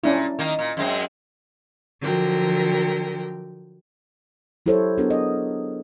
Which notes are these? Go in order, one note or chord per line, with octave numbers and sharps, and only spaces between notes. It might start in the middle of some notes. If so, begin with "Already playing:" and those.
A#2 C#4 D4 E4
D#3 A#3 D#4
A#2
F#2 G#3 C4
D3 F3 F#3 A#4 G5
F#3 E4 G4 A4 C5 C#5
B3 D4 E4 F#4 G#4 A#4
D#5